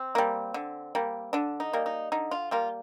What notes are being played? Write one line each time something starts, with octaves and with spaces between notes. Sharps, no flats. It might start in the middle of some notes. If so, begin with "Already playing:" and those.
Already playing: C4
G3 A#3
D3
G3 A#3
D3 D4
D#4
G3 A#3
D#4
D3 D#4
F4
G3 A#3 F4